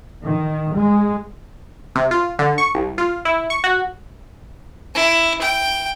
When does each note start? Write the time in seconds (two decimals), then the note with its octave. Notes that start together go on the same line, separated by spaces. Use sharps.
0.24 D#3
0.75 G#3
1.95 C3
2.11 F4
2.39 D3
2.58 C#6
2.74 C2
2.98 F4
3.25 E4
3.50 C#6
3.64 F#4
4.95 E4
5.41 G5